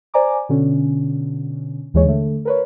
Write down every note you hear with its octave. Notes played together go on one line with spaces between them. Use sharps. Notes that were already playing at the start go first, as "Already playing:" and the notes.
C5 D5 G#5 A#5 D6
B2 D3 C#4
D#2 E3 G#3 C#5
D3 A3
A#4 B4 C#5